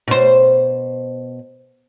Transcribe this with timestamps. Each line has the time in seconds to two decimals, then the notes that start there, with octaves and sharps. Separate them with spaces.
0.08 B2 C5